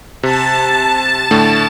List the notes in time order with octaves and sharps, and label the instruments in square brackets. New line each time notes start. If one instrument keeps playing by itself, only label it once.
[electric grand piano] C3 [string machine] A5
[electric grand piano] A2 D3 A3